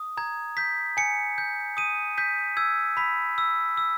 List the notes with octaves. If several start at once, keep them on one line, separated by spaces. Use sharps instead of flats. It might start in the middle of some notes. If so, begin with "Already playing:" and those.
Already playing: D#6
A#5 G#6
G6 B6
G#5 C#7
G6
D#6 D#7
G6 B6
E6 G#6
B5 B6
E6
E6